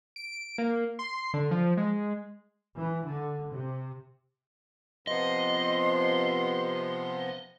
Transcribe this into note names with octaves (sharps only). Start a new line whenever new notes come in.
D7
A#3
C6
D3
F3
G#3
E3
D3
C3
C3 F3 B3 D#5 C6